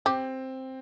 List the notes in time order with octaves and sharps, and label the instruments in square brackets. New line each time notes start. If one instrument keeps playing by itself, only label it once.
[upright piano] C4 [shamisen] G4